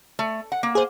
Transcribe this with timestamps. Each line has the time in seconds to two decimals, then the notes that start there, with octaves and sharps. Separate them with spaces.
0.19 A3
0.52 F#5
0.63 A#3
0.75 G#4 C5